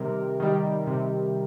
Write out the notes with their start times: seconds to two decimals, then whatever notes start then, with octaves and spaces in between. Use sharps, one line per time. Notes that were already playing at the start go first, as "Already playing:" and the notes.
Already playing: C3 D#3 G3 A#4
0.40 D#3 G3
0.87 C3